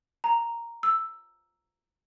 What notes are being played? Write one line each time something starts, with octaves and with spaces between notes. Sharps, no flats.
A#5
E6